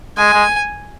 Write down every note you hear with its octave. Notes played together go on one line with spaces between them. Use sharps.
G#3 G#5
G#3